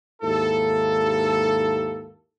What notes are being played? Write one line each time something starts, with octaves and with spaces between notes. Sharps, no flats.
D#2 G#2 A#3 E4 G4 A4